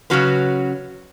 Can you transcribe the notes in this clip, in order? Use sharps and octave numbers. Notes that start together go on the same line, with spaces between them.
C#3 F#3 C#4 F#4 B4